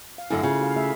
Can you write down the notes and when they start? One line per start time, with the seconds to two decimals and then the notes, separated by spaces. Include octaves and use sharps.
0.18 F5
0.30 F#2 D3 A3 E4
0.43 C#3 F4 G#4
0.59 F#4 F5
0.76 A3 G#4 E5